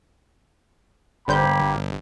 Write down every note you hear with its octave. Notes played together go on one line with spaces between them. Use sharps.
G1 D3 A#3 C5 G5 B5 G6